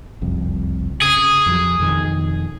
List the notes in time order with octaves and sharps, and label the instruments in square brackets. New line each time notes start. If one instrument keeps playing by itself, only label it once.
[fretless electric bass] F#1 C2 F2
[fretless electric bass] C#3 [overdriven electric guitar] G#4
[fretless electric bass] F2 F3 F#3
F2 B2 D#3